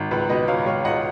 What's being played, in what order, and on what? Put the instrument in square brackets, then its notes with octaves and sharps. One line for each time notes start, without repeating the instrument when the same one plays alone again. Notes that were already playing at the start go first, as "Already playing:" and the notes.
Already playing: [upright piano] G#1
C#2 B4
B2 B4 D#5
C#2 C#5 F5
C#2 C#5 F5
C#2 D#5 F#5